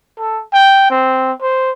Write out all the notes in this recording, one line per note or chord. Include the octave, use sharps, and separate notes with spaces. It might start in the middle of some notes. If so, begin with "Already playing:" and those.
A4
G5
C4
C5